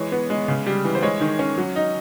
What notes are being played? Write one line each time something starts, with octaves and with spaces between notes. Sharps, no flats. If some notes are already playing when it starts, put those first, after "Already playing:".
Already playing: E3 G#3 C#5
B3
G#3
C#3
G3
E3
C5
G#3 C#5
D#3
C#4
F#3
D#4